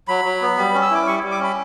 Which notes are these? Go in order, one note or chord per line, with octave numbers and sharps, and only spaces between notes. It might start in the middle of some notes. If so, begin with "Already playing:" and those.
F#3 B5
F#3
B3
G3
C#4
E6
E4 D6
G3 C#6
G3
D6
C#4 B5